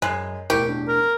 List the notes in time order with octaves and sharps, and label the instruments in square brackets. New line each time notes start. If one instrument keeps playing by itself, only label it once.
[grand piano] F#2 F#6 C7 [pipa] G#3
[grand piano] E1 A2 [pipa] G4 [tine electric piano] A#4 G5 C#6
[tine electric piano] D4
[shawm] A#4